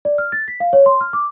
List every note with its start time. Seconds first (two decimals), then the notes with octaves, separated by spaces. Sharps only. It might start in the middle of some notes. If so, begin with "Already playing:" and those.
0.05 D5
0.18 F6
0.32 A6
0.48 B6
0.60 F5
0.73 C#5
0.86 C6
1.01 F6
1.13 D6